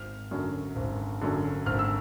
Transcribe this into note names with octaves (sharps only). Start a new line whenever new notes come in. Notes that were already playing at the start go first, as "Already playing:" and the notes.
Already playing: G#1 F6
F#2 D3
G#1
F#2 D3
G#1 F6
E6